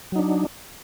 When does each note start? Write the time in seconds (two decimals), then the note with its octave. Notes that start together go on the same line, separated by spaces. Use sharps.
0.12 F#3
0.16 D#4
0.19 D4